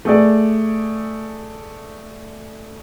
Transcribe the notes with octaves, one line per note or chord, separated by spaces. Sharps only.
A3 G#4 D5